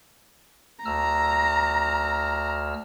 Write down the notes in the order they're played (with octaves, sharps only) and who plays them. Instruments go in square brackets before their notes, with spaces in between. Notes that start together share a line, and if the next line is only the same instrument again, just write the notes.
[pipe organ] D2 E6 F6 [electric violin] A#5